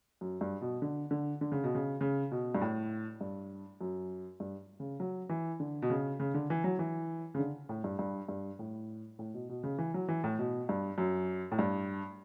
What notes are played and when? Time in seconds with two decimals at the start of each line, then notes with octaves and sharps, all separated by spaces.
0.21 F#2
0.41 G2
0.61 B2
0.82 D3
1.11 D3
1.41 D3
1.52 C#3
1.64 B2
1.75 C#3
2.01 C#3
2.31 B2
2.55 G2
2.61 A2
3.21 G2
3.81 F#2
4.40 G2
4.80 C#3
5.00 F#3
5.29 E3
5.60 D3
5.82 B2
5.90 C#3
6.20 C#3
6.34 D3
6.50 E3
6.64 F#3
6.79 E3
7.35 C#3
7.39 D3
7.69 A2
7.84 G2
7.99 G2
8.29 G2
8.59 A2
9.19 A2
9.34 B2
9.49 B2
9.64 C#3
9.78 E3
9.94 F#3
10.08 E3
10.24 A2
10.39 B2
10.69 G2
10.98 F#2
11.52 A2
11.59 G2